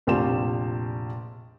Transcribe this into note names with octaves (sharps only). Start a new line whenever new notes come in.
F1 A#1 F4 G4 E7